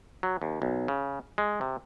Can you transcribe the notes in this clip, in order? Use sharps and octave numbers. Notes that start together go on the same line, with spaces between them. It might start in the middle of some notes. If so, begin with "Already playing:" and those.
F#3
D#2
B1
C#3
G#3
C3